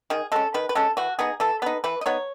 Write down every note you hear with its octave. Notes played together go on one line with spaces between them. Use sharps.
D#3 G#4
G#3 C#4 A4
D#3 B4
B4
G#3 C#4 A4
E3 F#4
B3 D#4 G#4
E3 A4
B3 D#4 B4
E3 B4
D#5
B3 D#4 C#5